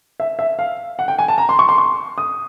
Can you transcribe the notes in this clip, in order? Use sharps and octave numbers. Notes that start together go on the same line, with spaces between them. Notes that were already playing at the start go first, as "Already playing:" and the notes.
E5
E5
F5
F#5
G5
G#5
A5
A#5
C6
C#6
C6
C#6
D#6